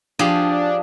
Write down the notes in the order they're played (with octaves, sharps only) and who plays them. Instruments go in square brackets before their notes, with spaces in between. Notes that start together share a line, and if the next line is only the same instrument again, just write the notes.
[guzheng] F3 G4 G#4 [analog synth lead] D4